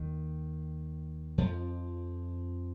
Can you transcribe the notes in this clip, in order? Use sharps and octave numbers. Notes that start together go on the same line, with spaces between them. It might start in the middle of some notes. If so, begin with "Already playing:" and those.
Already playing: D#2 D#3
F2 F3